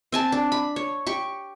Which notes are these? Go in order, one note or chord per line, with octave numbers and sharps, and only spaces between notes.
C4 G#5 A5
D4
B5
C#5
G4 C#6